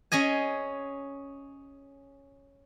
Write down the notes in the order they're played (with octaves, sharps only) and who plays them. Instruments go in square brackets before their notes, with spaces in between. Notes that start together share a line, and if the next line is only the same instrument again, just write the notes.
[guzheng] C#4 G#4 D#5 G#5